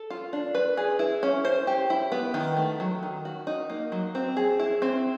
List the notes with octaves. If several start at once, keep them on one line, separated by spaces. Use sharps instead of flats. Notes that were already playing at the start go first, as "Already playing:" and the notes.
Already playing: A4
F4
D4
B4
G#4
E4
C#4
C5
G4
E4
B3
D#3
A3
F#3
D#3
F#4
D#4
A#3
F#3
C4
G#4
E4
C4